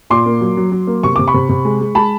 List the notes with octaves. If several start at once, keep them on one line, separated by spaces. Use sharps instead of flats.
A#2 C6 D6
A#3
F#3
F#3
F#3
A#3
C3 C#6
C3 D6
B5 C#6
C3
C3
G#3
G#3
G#3 A5 B5